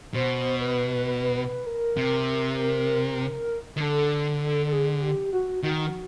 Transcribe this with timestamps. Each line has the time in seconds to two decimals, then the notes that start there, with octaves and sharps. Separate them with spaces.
0.14 B2 C5
0.61 B4
1.06 B4
1.36 B4
1.66 A#4
1.97 C3
3.77 D#3
3.80 D3 A4
4.67 A4
4.72 G#4
5.02 G4
5.33 F#4
5.63 D#3 F#4